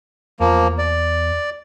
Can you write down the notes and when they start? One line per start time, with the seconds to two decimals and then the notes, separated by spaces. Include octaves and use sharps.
0.40 E2 F3 A#3
0.78 D5